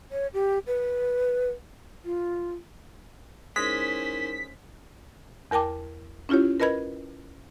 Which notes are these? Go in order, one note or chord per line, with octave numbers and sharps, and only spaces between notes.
C#5
G4
B4
F4
G#3 C#4 D#4 E4 A#4 C5 B6
E2 A#4 G5 A5 D6
C#4 E4 F4 G4 C#5
A#4 B4 D#5 B5 G#6